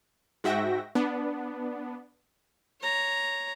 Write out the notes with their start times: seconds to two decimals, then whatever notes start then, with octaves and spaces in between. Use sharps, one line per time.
0.44 G#2 F#4 E5 G5 A#6
0.95 B3 D4
2.82 C#5 A#5